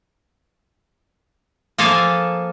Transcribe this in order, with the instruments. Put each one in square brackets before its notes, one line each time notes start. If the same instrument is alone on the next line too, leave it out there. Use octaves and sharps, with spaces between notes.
[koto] F3 A#3 A4 F5 G#5